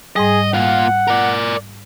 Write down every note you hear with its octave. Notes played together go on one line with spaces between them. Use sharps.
G#2 G3 G#4 D#5
A#2 F4 F#5
A#4 D5